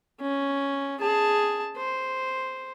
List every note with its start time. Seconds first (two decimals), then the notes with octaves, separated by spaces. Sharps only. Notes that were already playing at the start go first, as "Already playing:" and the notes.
0.21 C#4
1.00 G#4 A5
1.77 C5